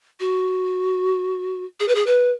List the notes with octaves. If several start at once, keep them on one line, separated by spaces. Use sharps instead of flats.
F#4
G#4
B4
G#4
B4